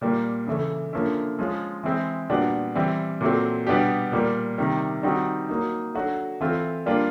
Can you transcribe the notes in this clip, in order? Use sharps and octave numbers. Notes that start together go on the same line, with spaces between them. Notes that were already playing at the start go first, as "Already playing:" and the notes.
A#2 G3 A#3
C#3 E3 A3
D3 F3 A#3 C#4 E4
F3 G#3 C#4 F4
E3 G#3 C4 E4
A#2 G3 B3 D4 F#4
E3 G3 C4
A#2 F#3 A3 C4
B2 G3 B3 D4 G4
A#2 G3 A#3
C3 D#3 G3
D#3 G3 C4 D#4 F#4
F#3 A#3 D#4
F#3 A3 D4 F#4
E3 A3 C4 F4
G3 A#3 D4 F4